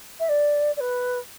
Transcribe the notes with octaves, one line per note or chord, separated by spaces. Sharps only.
E5
D5
D5
B4